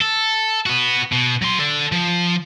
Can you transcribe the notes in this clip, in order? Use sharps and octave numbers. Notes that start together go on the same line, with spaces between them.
A4
B3 F#4
B2
F#3 C6
A4 D5
F3